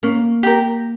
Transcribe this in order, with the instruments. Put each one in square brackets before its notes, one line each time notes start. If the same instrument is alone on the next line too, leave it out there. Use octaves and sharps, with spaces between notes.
[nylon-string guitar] A#3 [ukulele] C#4
[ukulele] G4 A#4